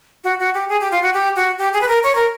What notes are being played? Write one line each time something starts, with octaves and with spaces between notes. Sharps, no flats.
F#4
F#4
G4
G#4
G4
F4
F#4
G4
F#4
G4
G#4
B4
A#4
C#5
A#4